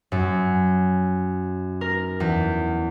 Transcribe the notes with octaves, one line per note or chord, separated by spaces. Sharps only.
F#2
A#4
E2